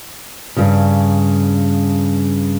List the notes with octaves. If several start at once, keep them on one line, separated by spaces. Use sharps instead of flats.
G2 C#3